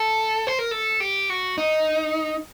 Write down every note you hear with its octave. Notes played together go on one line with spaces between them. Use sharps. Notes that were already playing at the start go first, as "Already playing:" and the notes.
Already playing: A4
C5
A#4
A4
G4
F#4
D#4